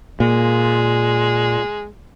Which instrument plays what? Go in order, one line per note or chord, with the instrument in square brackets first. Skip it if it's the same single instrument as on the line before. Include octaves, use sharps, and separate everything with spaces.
[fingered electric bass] A#2 [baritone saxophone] G#3